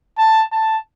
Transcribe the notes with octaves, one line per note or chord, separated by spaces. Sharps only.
A5
A5